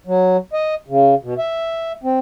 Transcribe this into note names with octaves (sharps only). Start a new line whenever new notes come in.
F#3
D#5
C#3
B2
E5
C4